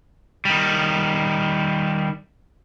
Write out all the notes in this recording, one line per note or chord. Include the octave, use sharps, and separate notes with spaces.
D#3 G3